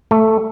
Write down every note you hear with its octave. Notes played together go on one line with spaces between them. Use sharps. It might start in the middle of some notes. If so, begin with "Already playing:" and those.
A3